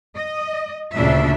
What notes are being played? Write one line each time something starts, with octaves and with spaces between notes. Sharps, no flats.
D#5
D2 A#2 C#3 D4 E5